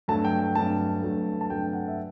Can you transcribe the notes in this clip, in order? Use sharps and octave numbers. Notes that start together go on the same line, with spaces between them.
G2 F#3 A3 A5
G5
G5
G2 F#3 A3 A5
G2 F#3 A3
A5
G2 F#3 A3 G5
F#5
E5